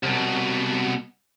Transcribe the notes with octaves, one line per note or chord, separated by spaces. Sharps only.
C2 B2